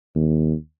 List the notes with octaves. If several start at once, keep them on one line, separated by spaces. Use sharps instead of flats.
D#2